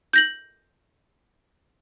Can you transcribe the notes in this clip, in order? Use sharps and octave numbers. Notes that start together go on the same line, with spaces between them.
G6 A#6 F#7